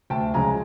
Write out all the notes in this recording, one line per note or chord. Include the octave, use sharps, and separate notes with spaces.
D2 G5 A5
C#3 F3 G#3 G#5 A#5